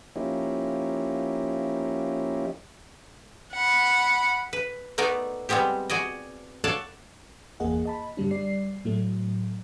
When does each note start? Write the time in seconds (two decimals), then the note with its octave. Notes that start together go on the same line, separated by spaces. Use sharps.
0.16 F3 A#3 C#4 D#4 E4 G4
3.53 F#5 B5
4.53 B4
4.98 A3 B3 D#4 A#4 D5
5.49 G3 G#3 B3 C4 G4
5.90 F#4 G#4 D5 D#5
6.64 A4 C#5 D5 F5 F#5 A5
7.60 G1 E2 A#3 G#4 D#5 F#5
7.85 D#5 A5 B5
8.17 G2 D3 G3 D4
8.31 G3 D5 C7
8.85 A2 F#3 A3